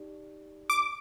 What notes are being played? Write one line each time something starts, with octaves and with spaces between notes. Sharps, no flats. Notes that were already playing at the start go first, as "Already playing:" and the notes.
Already playing: D#4 G4 D5
D6